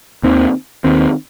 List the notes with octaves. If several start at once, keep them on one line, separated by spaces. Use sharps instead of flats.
D#2 D#3 C4
D#2 D#3 C4